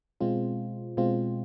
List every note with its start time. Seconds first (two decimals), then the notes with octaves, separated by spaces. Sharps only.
0.21 B2 G#3 C4 F4
0.97 B2 G#3 C4 F4